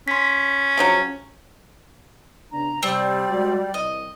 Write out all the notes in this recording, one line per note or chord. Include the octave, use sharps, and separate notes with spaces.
C#4 C6 B6
C#3 F3 F#3
C#3 B3 D4 A#5
C3 G3 C4 D5
G#3 F#4
C2 D#5